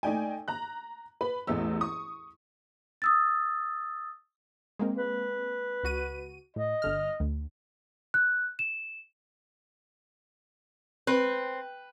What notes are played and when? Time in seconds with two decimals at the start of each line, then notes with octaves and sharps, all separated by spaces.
0.03 A3 D#4 D5 G5 G#5
0.48 A#5 F#6
1.21 B4 B5
1.47 A1 E2 A3 E6
1.81 C#6 D#6
3.02 D#6 E6 A6
4.79 G#3 A#3 C4
4.98 B4
5.84 C#2 F#4 D#7
6.56 A2 D#5
6.82 G1 D3 F6
7.20 D2
8.14 F#6
8.59 E7
11.07 C4 B4